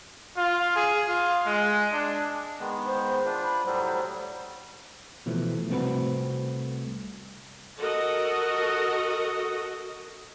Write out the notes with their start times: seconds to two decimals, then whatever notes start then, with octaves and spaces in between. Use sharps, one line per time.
0.37 F4
0.76 G#4
1.08 F4
1.46 G#3
1.93 D4
2.60 D#3 G#3 B3
2.86 C5
3.25 D4 F4
3.43 B5
3.66 A2 F#3 G3 C5
5.26 B2 E3 F3 A3
5.69 C2 A3 C4 F#4 B4
7.78 F#4 A4 A#4 D#5